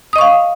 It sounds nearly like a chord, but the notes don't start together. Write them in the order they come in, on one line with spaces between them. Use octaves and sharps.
D#6 D#5 C#6 F5